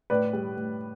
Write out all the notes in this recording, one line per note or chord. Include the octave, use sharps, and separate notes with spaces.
A2 B4 D5
G3
A2